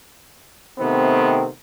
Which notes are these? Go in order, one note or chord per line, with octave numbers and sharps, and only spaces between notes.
C3 D#3 A3 B3 C4